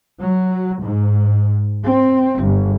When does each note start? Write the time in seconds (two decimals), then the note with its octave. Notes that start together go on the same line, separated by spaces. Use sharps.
0.22 F#3
0.82 G#2
1.85 C4
2.42 G1